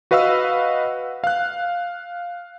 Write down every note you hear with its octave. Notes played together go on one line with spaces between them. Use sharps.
F#4 B4 D#5 F5 F#5 E6
F5 F#6